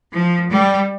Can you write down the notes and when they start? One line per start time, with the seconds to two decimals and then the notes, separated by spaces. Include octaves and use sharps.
0.13 F3
0.51 G3